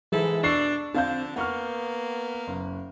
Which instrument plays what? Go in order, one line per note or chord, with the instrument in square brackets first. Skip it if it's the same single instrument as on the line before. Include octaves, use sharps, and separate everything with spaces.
[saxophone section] G#2 E4 A4 [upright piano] E3 G#3 G#4
[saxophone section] B2 D4 [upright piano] C#6 E6 C7
[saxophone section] D3 F3 D4 [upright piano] C4 F5 G6
[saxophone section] A#3 B3 [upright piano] F#5 C#6 F6
[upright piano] F#1